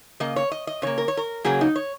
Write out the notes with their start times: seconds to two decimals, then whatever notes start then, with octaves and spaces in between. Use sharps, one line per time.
0.20 C#3 A#3 D#5
0.36 C#5
0.51 D#5
0.67 D#5
0.82 C#3 A#3 C#5
0.98 A#4
1.08 C#5
1.17 A#4
1.44 C#3 F#3 A#3 G#4
1.61 D#4
1.76 C#5